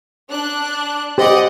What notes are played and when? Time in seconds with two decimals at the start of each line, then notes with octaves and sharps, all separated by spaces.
0.30 D4 F#6
1.18 G4 C5 D5 D#5 F#5